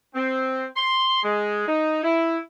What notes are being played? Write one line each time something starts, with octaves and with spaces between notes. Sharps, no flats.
C4
C6
G#3
D#4
E4